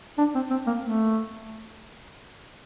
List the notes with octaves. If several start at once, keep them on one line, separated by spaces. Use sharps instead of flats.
D4
C4
C4
A#3
A3